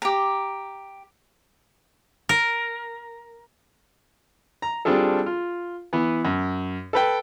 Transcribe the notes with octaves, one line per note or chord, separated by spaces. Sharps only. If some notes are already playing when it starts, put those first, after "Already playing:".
G4 A#5
A#4
A#5
G3 C4 D4 F4 G#4 A4
F4
E3 B3
F#2
A4 B4 G5